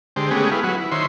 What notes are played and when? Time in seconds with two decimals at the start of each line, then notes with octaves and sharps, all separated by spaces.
0.16 D3 G#3 G4 C5
0.31 G#3 A3 B3 C#4 G4 G#4
0.51 E4 G#4 B4 F5
0.63 F#3 F#4 B4
0.80 E4
0.91 D#3 C5 C#5 E5 C6